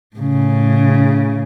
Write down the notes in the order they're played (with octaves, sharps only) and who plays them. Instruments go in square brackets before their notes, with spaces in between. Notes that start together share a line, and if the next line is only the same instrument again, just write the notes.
[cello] A2 C#3